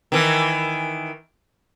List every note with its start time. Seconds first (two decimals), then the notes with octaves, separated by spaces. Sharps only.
0.12 D#3 E3